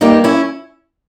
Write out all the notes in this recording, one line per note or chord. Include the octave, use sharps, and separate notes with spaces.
G2 G3 A#3 D#4 G4
C#4 E4